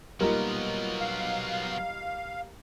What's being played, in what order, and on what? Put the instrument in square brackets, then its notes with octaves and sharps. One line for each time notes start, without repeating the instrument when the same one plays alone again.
[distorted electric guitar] F#3 B3 [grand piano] G3 A#3 [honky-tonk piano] D#4 F4 A#4
[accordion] F5